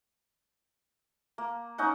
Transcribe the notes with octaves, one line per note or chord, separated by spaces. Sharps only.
A#3
C#4 D#4 F#5